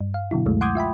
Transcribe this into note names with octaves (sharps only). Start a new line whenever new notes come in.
G2
F5
B2 D3 F#3 E4
C#2 F#2 F#3 G#3 A3
F#5 C6 D6 D#6 G6 G#6
F4 E5 G5 B5